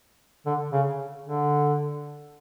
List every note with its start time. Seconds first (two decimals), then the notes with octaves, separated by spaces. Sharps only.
0.46 D3
0.73 C#3
1.26 D3